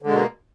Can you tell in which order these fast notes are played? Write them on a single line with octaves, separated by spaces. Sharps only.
D3 G#3 B2 A#3